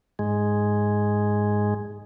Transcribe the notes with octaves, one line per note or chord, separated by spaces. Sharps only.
G#2 G#3